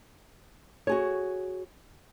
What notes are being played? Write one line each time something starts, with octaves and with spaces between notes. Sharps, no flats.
F#4 G#4 C#5